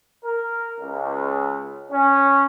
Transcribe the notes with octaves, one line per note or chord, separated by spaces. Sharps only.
A#4
C#2
C#4